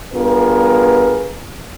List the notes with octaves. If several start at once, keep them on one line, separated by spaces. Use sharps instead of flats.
G2 B3 F4 G#4 A#4 B4